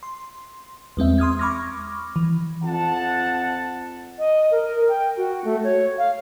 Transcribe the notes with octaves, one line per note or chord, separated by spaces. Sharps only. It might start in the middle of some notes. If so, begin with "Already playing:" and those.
C6
E2 G#3 C4 E5
C6 D#6 F6 G#6
B5 C#6 D6 F6 G#6 A#6
E3
F2 F#5 A5
D#5
A#4
G5
F#4
A3
C#5
F5